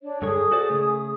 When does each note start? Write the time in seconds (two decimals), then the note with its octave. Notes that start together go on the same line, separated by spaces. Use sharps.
0.02 D4 C#5
0.22 G2 D3 G#4 A4 C#5 D#6
0.52 F#4 C5 D5
0.70 C#3 A3